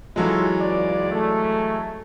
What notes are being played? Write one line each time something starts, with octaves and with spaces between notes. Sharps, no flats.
E3 F#3 G#3 E4 F4 A4
C#2 D5
A3